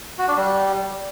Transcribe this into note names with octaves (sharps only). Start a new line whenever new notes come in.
F#4
D4
G3